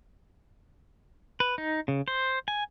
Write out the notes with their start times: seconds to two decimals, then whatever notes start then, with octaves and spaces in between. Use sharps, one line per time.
1.40 B4
1.58 D#4
1.88 C#3
2.08 C5
2.48 G#5